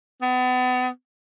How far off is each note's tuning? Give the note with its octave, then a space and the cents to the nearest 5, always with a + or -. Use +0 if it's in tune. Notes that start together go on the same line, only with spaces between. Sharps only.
B3 +35